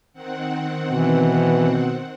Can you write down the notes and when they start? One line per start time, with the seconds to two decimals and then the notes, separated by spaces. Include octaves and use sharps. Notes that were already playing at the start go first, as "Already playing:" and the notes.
0.13 D#3 C4 F#5
0.91 B2 E3